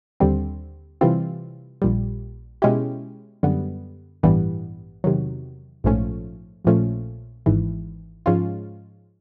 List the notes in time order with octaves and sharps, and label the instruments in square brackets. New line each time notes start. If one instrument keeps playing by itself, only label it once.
[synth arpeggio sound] D#2 D3 G3 C4
C3 E3 G3 C4 F4
A#1 A#2 G3
B2 G#3 C#4 E4 G4
F#2 D3 G3 B3
A1 G2 E3 G3 B3
E2 C3 D#3 F#3
A#1 G#2 F3 A3 C#4
A#1 A#2 F3 A3 C#4
G#1 G#2 E3
G#2 F3 G#3 C#4 F4